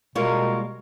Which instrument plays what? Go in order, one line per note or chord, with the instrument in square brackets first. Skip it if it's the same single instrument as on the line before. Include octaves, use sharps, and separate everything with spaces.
[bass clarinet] B2 [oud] G3 G#3 A#3 [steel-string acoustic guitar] F4 C#5 [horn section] A#4